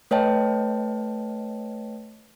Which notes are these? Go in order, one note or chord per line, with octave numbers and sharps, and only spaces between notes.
A3 B4 C#5 D#5 G5 A5